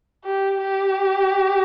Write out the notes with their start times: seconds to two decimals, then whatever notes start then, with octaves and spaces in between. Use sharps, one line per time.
0.25 G4
0.61 G4